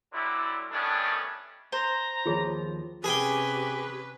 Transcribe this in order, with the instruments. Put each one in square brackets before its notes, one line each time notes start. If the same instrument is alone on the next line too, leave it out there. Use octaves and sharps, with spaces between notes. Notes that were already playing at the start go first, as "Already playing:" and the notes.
[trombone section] D3 F#3 G3 E4
D#3 G3 A3 B3 C#4 D4
[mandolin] C5 [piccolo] A#5
[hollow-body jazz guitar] D#2 F3 [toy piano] F4 G#4 C#5
[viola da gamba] C3 C#4 [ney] G4 [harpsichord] G#4 G5 [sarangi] B4